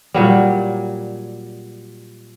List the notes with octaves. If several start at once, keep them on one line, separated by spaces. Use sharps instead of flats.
A#2 F#3 G3